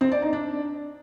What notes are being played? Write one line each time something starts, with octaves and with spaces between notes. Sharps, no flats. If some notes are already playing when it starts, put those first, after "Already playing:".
C4
D5
D#4
D4